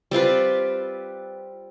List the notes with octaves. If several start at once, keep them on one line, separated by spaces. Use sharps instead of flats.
G3 C4 F4 B4